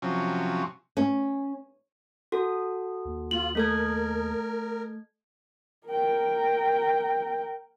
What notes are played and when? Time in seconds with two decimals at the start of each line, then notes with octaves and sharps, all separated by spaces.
0.02 C3 F3 F#3 C#4
0.97 C#4
2.32 F#4 A4
3.05 D#2
3.31 F4 F#7
3.55 A3 A4 A#4 G#6
5.87 A#4 G5